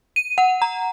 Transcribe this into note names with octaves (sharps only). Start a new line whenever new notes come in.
D#7
F#5
A#5